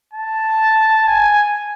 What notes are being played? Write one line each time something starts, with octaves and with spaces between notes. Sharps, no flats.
A5
G#5